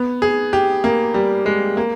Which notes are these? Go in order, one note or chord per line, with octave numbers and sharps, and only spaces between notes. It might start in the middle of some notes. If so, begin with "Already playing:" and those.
Already playing: B3
G#4
G4
A#3
G3
G#3
A#3